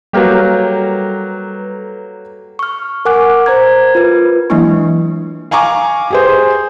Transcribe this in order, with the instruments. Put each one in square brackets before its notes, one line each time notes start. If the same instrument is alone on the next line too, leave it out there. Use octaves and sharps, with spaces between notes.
[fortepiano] F#3 A#3 G4 [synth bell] G3 A4 B4
[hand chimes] C#6 F6
A#4 F#5 G#5 D6 F6 F#6
A#4 C5 A#5 G#6
F4 B4
[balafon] E3 F#3 G#3 A#3 D4 E4
[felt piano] F5 G#5 A#5 C#6 D6
G4 G#4 C5